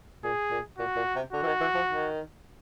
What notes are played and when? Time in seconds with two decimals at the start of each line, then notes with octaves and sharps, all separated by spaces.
0.24 A#2 G#4
0.51 A#2
0.78 A#2 F#4
0.96 A#2
1.15 C3
1.33 D3 F#4
1.43 E3
1.47 D#3
1.61 E3
1.75 F3
1.87 D#3